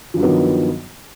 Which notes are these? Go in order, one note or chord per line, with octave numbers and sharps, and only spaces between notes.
G2 D#3 F3 F#3 B3